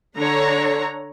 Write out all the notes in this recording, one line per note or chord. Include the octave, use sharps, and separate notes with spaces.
D3 D4 C#5 A#5